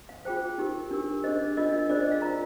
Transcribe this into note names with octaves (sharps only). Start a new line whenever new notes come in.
F5
F4 G#4 C5 G5
D#4 G4 A#4
D4 G4 A#4
D4 G#4 C5 D#5
D4 F4 A#4 D#5
D#5
D4 G#4 C5 D5
D#5
F5
F4 A#4 A#5